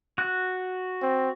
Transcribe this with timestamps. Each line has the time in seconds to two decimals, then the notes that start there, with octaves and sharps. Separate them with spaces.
0.18 F#4 F#6
1.02 C4